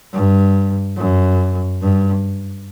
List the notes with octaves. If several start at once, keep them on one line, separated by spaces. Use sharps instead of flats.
G2
F#2
G2